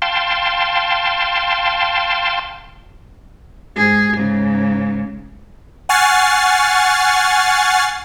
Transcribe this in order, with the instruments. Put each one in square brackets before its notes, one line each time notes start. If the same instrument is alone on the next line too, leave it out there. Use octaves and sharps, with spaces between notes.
[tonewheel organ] F5 G5 A5 C6
[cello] G#2 G#4
G#2 C#3
[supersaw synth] F#5 G#5 C#6 F6 A6 C7